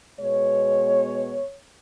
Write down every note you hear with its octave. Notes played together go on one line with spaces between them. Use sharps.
B2 G#3 B3 C#5